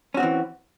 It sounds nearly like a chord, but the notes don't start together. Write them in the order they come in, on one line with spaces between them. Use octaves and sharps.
C#4 F#4 C4 E3